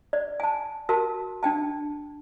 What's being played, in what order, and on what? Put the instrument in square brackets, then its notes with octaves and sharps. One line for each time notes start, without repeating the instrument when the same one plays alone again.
[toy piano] D5
G#5 A5
F#4 A#4 A5
D4 G5 A5